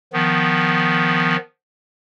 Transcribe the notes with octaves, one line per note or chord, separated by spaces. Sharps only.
D#3 F3 B3